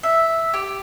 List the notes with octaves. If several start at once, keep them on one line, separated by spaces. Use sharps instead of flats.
E5
G4